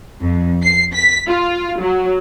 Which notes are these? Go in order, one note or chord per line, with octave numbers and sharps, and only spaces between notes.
F2
C7
B6
F4
F#3